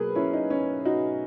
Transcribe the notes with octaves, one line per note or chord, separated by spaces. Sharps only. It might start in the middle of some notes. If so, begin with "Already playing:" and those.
Already playing: B2 F#3 A#3 G#4 A#4 B4
C#4 E4
D#4
C#4
D#4 F#4